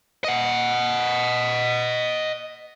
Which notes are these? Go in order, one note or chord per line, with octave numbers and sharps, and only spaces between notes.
D#5 F#5